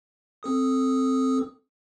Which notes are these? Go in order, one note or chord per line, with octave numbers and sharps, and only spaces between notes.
C4 A4 D#6